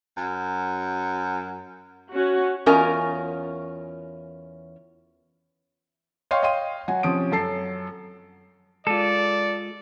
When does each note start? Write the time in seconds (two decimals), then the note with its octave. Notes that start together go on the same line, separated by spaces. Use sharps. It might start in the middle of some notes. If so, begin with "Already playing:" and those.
0.17 F#2
2.11 C#4 F#4
2.66 E2 C#4 F4 A#4 D#5 G#5
6.31 C#5 D#5 F5 G5 C6 C#6
6.43 D#5 F5 G5 C6 D#7
6.88 F#3 F#4 G#5
7.03 C3 F3 C#4 D#6 D7
7.32 F#2 A4 A5 C7
8.87 G#3 F4 A4 D5